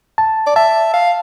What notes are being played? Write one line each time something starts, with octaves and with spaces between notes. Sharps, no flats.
A5
D5
E5 A5
F5